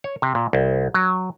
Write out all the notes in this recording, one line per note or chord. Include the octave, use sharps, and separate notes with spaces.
C#5
C3
A#2
C2
F#3